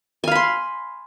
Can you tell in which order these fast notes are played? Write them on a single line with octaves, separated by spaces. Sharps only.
G#5 F5 B5 C6